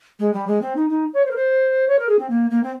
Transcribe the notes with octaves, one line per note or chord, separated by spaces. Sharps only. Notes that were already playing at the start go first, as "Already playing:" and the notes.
G#3
G3
G#3
C4
D#4
D#4
C#5
C5
A#4
C5
C#5
A#4
G#4
C4
A#3
A#3
C4